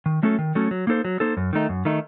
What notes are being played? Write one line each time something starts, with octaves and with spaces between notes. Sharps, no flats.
D#3
F#3 A3 C#4 A4
D#3
F#3 A3 C#4 A4
F#3
A#3 D#4 A4 C5
F#3
A#3 D#4 A4 C5
F#2
D#3 A3 D#4
F#2
D#3 A3 D#4